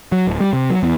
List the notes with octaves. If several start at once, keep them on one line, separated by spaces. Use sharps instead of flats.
F#3
D1
G3
C3
F#3
E2